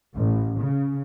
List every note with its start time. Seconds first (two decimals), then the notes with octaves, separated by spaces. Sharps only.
0.16 A1
0.60 C#3